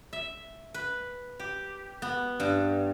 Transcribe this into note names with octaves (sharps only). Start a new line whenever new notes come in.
E5
B4
G4
B3
G2